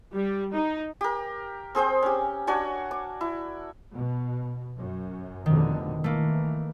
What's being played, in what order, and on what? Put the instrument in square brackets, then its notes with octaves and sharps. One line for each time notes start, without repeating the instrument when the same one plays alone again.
[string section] G3
D#4
[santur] G4 A#4
C4 G#4 C5 G5
C#4 G4
D4 F#4 C#5 G#5
D6
E4
[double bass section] B2
F#2
[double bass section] F1 B2 D3 [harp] D#3
[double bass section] E3 [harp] A3 A#3